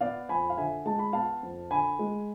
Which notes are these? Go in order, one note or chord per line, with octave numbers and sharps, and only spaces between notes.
B3 D5 F5
F2 G#5 B5
F5
D3 E5 G#5
G#3 A5
B5
B3 F5 A5
F2
D3 G#5 B5
G#3